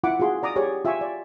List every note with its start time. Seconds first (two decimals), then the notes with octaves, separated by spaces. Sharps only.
0.04 E4 F4 F#5 B5 D6
0.20 F4 F#4 G#4 C6
0.43 D5 A#5 D6 D#6
0.56 G4 G#4 C#5 D5
0.85 F4 E5 G5 G#5 C#6
1.01 D5